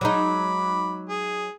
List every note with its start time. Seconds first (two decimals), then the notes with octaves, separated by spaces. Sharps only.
0.01 F#3 G#3 D#4 B5 D6
1.09 G#4